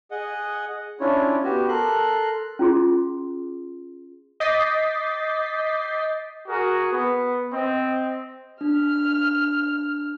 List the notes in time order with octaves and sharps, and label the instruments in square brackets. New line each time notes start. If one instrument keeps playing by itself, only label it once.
[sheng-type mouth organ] G#4 D#5 F#5
C#4 D4 E4 F4 C#5
B3 F#4 G4
A4 A#4 C6 F#6
[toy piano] C#4 F4 G#4 C6
[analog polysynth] D#5 D6 G6 A6 B6 C7
[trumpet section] F#4 G#4 A#4
B3
C4 D#5
[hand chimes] D4 [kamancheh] F6